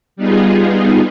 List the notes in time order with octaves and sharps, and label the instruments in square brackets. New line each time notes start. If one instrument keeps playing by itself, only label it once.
[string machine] G3 B3 D#4 F4 G#4